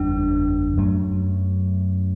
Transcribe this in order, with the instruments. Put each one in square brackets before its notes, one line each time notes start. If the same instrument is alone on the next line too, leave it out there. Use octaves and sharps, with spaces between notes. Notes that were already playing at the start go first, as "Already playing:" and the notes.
Already playing: [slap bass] F#1 E2 G3 [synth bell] D4
[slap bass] F#2 F#3 A3